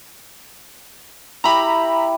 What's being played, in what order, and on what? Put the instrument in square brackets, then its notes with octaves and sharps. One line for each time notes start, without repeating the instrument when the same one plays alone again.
[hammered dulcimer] E4 G4 [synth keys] A#5 B5